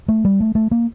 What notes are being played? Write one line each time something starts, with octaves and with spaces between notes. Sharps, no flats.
A3
G3
A3
A3
A#3